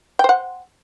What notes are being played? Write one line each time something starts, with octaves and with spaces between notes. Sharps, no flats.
C5 F#5 G5